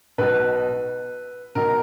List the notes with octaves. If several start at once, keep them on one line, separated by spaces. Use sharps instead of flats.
B1 B2 B4
B1 B2 A#4